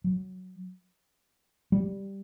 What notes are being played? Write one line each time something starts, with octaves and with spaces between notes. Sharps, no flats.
F#3
G3